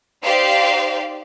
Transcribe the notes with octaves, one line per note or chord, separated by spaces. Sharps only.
D#4 G4 C5 D5 F5